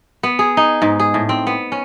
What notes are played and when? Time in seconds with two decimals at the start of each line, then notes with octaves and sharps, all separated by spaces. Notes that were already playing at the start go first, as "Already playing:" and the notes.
0.23 B3
0.39 G#4
0.57 D#4
0.82 G#2
0.99 G#4
1.14 A2
1.29 C4
1.47 B3
1.72 C#4